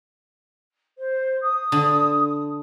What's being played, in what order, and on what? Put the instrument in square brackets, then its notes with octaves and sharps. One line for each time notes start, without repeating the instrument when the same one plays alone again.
[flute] C5
D#6
[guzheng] D3